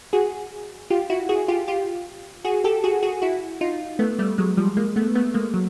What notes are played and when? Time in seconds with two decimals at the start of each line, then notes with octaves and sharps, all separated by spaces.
0.13 F#4 G#4
0.90 F4 G4
1.10 E4 F#4
1.29 F#4 G#4
1.48 F4 G4
1.68 F4 G4
2.45 F#4 G#4
2.64 G4 A4
2.84 F#4 G#4
3.03 F#4 G#4
3.22 E4 F#4
3.61 D#4 F4
3.99 A3 B3
4.19 G3 A3
4.38 F#3 G#3
4.57 F3 G3
4.77 G#3 A#3
4.96 A3 B3
5.15 A3 B3
5.34 G#3 A#3
5.54 F#3